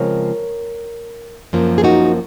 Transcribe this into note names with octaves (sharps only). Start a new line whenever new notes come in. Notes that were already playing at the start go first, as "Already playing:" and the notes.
Already playing: C#3 F3 G#3 C4 A#4 C#5
F#2 F3 A#3
G#4
D#4 F#4